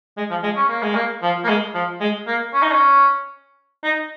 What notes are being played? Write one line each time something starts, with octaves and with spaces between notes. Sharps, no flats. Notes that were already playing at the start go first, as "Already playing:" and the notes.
G#3
F3
G#3
C#4
A#3
G#3
A#3
F3
A#3
G#3
F3
G#3
A#3
C#4
D#4
C#4
D#4